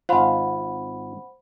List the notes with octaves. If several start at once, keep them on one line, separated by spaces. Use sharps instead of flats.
G#1 F4 C5 F#5 B5